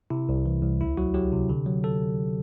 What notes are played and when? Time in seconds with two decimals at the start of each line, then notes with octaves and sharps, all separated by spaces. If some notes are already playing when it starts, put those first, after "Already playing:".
0.10 C3 E4
0.29 C2
0.46 E3
0.63 C2
0.80 D2 E4
0.97 F#3 F#4
1.14 F#3 G4
1.32 C3
1.49 D3
1.67 F#3
1.84 A4